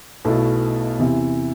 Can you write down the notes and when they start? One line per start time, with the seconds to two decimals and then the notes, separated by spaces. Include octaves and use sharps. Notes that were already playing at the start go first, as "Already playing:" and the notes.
0.25 B1 B2 A3 E4
0.98 E2 C3 E3